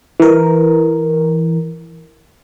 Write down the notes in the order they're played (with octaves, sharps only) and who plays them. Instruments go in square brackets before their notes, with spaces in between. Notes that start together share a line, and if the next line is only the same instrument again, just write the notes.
[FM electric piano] E3 A#4